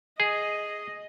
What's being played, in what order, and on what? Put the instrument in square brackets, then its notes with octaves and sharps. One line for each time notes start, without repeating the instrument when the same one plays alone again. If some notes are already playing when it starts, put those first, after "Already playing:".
[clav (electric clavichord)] G#4 [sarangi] D#5